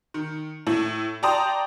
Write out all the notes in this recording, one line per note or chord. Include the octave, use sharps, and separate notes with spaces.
D#3
A2 E4
D5 G5 A5 A#5 C6 D#6